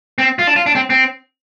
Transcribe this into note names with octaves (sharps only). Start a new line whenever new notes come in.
C4
F4
D4
F4
D4
C4
C4